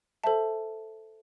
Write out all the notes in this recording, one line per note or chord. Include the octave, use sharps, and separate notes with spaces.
A4 C5 E5 A5